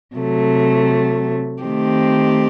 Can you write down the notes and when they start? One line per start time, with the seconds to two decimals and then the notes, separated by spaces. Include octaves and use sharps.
0.15 C3 F#3 A3
1.63 D#3 A3 C4 G4